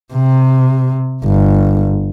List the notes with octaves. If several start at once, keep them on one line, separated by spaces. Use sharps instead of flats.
C3
G1